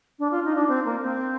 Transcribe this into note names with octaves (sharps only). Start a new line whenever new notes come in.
D4
F4
D#4
D4
C4
A#3
C4